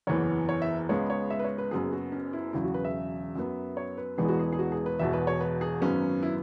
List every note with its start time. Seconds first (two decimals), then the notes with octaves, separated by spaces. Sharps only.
0.07 F#1 E2 E3 B3 C#5
0.49 C#5
0.62 E5
0.89 C#2 C#3 G#3 B3 C#5
1.10 C#5
1.30 E5
1.39 B4
1.44 C#5
1.58 B4
1.71 F#1 F#2 F#3 B3 G#4
1.92 F#4
2.12 C#4
2.33 E4
2.53 E1 E2 C#3 F#3 E4
2.64 F#4
2.74 B4
2.85 E5
3.36 F#2 F#3 B3
3.77 C#5
3.97 B4
4.18 E1 E2 E3 G#3 B3 G#4
4.28 F#4
4.39 G#4
4.53 G#4
4.59 F#4
4.72 G#4
4.86 B4
4.99 E1 E2 B2 E5
5.13 B4
5.27 C#5
5.40 B4
5.61 G#4
5.81 G#1 F#2 F#3 B3 C#4
6.23 E4